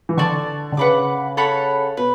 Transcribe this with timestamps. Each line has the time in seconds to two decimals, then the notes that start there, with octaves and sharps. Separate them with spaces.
0.09 E3
0.17 D3 D5 A5 C#6
0.72 D3
0.77 C#3 B4 F#5 B5 D6
1.37 A4 C#5 F#5 B5
1.97 B2 B4